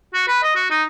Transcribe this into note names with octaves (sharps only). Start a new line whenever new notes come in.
F#4
B4
D#5
F#4
D#4